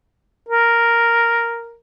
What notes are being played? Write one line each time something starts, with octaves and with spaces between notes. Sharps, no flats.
A#4